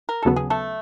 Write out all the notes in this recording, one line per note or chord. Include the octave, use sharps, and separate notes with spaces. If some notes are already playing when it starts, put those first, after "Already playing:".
A#4
D#2 C#3 F#3 B3 A4
G#4
A3 A4